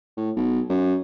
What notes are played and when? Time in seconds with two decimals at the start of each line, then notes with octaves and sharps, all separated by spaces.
0.17 A2
0.36 B1
0.69 F#2